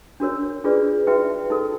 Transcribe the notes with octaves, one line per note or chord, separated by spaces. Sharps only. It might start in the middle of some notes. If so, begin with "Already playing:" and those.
D4 F#4 A#4 C#5
D4 F4 G#4 B4 D5
D#4 F#4 B4 E5 G5
D#4 F#4 A4